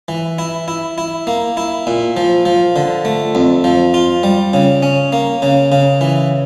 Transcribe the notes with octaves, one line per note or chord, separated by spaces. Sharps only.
E3
E4
E4
E4
A#3
E4
A#2
F3
F3
D3
A3
F2
F3
F4
G3
C#3
C#4
A#3
C#3
C#3
E3